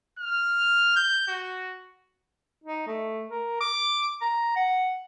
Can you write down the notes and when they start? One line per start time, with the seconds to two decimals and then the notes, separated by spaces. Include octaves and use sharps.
0.19 F6
0.96 G6
1.28 F#4
2.64 D#4
2.87 A3
3.30 A#4
3.61 D6
4.22 A#5
4.56 F#5